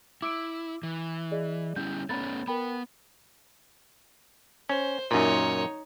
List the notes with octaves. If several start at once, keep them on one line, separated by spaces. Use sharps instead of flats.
E4 D6 E6 D7
E3
G#4 D5 D#5
G3 C#4 E4 G6
A3 B3 C#4 A#5 B5 A6
B3 A#4 G5 B5
C#4 C5
F#2 A#2 D#4 C#5